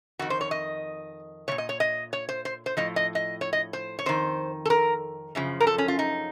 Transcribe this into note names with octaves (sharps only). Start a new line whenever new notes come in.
F2 D#3 F#4
C5
C#5
D#5
F3 C#5
A#2
D#5
C#5
D#5
C#5
C5
C5
C5
A2 F3 D#5
D#5
D#5
C#5
D#5
C5
C#5
F2 D#3 C5
A4
A#4
F#2 C#3 F3
A#4
A4
C#4
F4
D#4